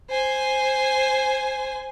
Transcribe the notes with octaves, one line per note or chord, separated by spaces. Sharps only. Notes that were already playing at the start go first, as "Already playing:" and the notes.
C5 G#5